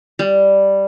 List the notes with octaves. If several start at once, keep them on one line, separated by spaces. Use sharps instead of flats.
G3